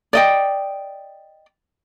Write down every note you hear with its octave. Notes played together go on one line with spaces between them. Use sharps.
D5 D#5 G5